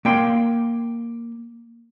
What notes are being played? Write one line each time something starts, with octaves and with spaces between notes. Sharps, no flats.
A#3 G5 C6